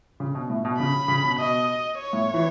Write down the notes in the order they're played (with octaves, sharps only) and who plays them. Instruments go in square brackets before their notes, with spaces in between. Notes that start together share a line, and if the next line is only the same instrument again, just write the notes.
[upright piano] C#3
B2
A2
B2
[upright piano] C#3 [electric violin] B5
[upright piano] C#3
B2
[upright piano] B2 [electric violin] D#5
[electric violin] C#5
[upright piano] A2
E3